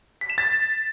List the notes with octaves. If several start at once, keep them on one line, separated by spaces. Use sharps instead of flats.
B6
E7
A6